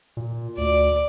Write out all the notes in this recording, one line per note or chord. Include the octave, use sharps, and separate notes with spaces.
A#2
D2 D5